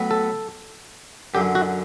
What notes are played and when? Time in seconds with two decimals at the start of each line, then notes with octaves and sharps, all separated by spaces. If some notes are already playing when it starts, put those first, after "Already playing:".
Already playing: A2 F#3 B3 F#4
0.11 A4
1.34 F#2 D3 F#3 G4
1.55 F#4